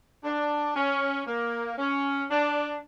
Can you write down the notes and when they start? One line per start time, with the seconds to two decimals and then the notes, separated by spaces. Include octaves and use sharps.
0.24 D4
0.76 C#4
1.27 A#3
1.78 C#4
2.31 D4